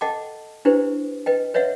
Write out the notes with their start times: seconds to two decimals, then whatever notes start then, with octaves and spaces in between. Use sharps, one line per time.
0.01 A4 D#5 F#5 G5 A5 D6
0.65 D4 E4 G4 B4 C5
1.26 B4 D#5 G5
1.54 B4 C#5 D#5 E5 F#5